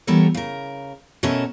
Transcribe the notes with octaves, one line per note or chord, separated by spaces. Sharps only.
E3 G3 B3 A4 A#4 C#5
C#3 A#4
B2 A3 C#4 A4 A#4 E5